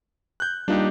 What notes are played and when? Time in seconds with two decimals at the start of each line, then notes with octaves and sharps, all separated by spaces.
0.40 F#6 G6
0.68 G3 A#3 D4 D#4 F4 G4